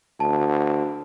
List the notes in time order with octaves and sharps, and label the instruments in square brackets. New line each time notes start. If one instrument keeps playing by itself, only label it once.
[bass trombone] D2 [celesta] A5